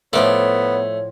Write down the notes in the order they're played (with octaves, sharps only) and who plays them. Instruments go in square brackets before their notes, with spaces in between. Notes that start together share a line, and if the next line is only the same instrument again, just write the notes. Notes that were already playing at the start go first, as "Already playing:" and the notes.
[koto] A2 F3 D5 [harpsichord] A3 [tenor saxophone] B3 [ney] C#5